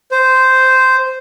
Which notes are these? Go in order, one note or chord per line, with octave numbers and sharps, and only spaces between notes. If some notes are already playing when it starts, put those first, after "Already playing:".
C5